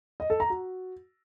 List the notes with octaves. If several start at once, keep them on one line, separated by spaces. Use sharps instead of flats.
D#5
A4
A#5
F#4